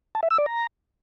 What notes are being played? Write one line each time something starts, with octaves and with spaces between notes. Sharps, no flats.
A5
E5
E6
D5
A#5